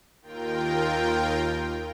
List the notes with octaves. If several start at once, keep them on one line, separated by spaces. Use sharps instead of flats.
D#2 F4 A#4 G5